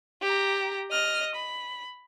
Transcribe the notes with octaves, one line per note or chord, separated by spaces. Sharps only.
G4 A#5
D#5 F6
B5